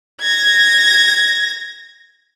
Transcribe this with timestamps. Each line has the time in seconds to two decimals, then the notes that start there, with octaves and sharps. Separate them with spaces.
0.22 G#6 A#6